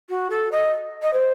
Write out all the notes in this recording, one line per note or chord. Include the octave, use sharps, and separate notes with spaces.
F#4
A4
D#5
D#5
C5